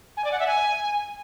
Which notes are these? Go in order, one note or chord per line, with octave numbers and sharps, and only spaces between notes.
G#5
D5
F#5
E5
G#5